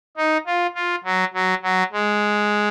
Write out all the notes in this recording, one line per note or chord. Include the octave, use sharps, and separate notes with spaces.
D#4
F4
F4
F#3
F#3
F#3
G#3